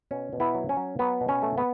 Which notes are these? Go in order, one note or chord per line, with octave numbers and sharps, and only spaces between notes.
B2 C#4
B2
B3 E4
F#3
C#4
F#3
F#3 B3
B2
C#4
A3
B3